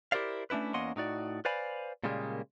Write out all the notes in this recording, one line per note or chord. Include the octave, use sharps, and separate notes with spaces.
E4 G4 A#4 C5 D5 F5
A3 C#4 D4 E4 B4
E2 A#3 C#4 D#5 F#5 C6
A2 D#4 F#4 D5
B4 C5 D5 F5 G#5 B5
A#2 C#3 G3 G#3 A#3